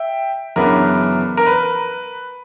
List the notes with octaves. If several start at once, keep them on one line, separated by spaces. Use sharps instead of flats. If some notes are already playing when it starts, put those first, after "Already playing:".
Already playing: E5 G5
F#2 C#3 E3 B3 D4 A#4
A#4
B4